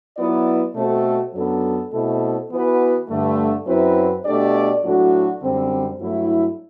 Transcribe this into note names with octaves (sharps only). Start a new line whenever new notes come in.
F#3 B3 E4 B4 D5
B2 A3 C4 F#4 A4
F#2 F#3 B3 D4 A4
B2 A3 C4 E4 A4
E3 B3 F#4 B4
G2 D3 A3
F#2 F#3 C4 E4 B4
B2 A3 D4 G4 D5
A2 F#3 A3 D4 F#4
F#2 D3 G3 C4
G2 F#3 A3 E4